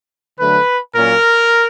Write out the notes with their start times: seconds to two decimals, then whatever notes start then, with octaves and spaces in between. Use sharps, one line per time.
0.39 D3 F#3 A3 B4
0.95 A#2 F#3 A#3 C#4 A#4